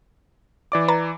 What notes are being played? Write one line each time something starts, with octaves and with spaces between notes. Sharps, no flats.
E3 D5 D6
B4 A#5 A6